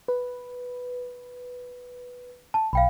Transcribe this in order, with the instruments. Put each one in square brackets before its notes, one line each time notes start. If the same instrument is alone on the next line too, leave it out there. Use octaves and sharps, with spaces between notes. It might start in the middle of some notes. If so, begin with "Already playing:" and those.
[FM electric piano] B4
[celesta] A5
[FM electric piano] B1 [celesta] F5 G5 B5